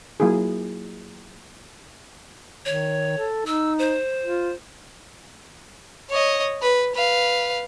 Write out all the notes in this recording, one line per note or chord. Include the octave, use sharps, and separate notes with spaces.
F#3 A#3 E4 F4 G#4
D#3 C#5
A4
D#4 E6
C5
F4
C#5 D#5
B4
B4 F5